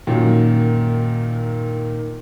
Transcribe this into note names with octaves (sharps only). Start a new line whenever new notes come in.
F#2 A#2 D#3 F#3